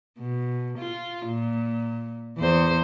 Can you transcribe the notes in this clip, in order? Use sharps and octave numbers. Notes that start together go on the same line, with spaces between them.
B2
F4
A#2
E2 C5